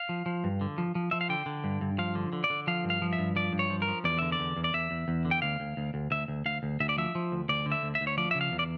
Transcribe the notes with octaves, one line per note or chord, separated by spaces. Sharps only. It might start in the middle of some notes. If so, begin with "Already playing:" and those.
Already playing: F5
F3
F3
G2
D3
F3
F3
F3 E5
F5
D3 G5
D3
G2
G2
F3 F5
D3
D3
D5
D3
F3 F5
G2
F5
F3
E5
G2
F3 D5
G2
C#5
F3
A#4
F3
E2 D5
D3 E5
D5
E2
E2
D5
E2 E5
E2
E2
D3
G5
D2 F5
D2
D2
D2
D2 E5
D2
D2 F5
D2
D2 E5
D5
F3 E5
F3
D2
D2 D5
D3
E5
D2
E5
D2
C#5
F3 D5
C#3 E5
F5
E2
D5